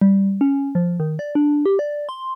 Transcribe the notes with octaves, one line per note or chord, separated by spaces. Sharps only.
G3
C#4
F3
D#3
D5
D4
G4
D5
C6